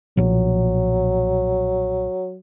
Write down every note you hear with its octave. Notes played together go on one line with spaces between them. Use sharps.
B1 A#2 F3 F#3